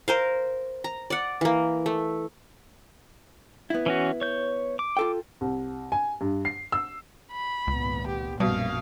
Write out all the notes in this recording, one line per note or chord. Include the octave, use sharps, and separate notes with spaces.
A#4 C5 F5
A#5
D5 F#5
E3 A#3
A3
B3 E4
E3 C#4 F#4
C#5 G6
D6
F4 A4 G5
C2
G#5
G2
C7
E6
B5
G#1 C#2 A#2 B3
G4
A#1 F#2 B2 G3 F5